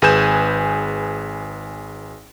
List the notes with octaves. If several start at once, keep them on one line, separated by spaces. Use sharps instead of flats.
G#1 G#4 B4 G#5 G6 E7